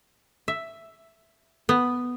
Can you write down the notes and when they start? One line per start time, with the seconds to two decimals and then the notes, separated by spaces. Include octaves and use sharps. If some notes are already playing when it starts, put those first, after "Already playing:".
0.48 E5
1.69 B3